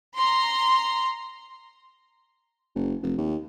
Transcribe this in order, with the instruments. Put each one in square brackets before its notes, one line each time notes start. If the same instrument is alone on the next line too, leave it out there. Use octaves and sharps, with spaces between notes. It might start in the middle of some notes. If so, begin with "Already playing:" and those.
[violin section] A#5 C6
[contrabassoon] F#1
F1
D#2